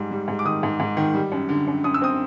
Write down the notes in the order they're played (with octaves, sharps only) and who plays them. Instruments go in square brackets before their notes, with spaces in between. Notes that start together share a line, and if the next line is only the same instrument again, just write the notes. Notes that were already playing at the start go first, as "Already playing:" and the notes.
Already playing: [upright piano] G#2 G3
G3
G#2
D6
D#3 D#6
G#2
G#2
D#3
G3
F#2
D3
F#2
F#2 D#6
E6
C4 D#6